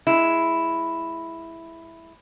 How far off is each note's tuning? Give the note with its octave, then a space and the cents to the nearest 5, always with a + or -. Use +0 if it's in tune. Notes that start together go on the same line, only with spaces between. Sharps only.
G#3 +0 E4 +0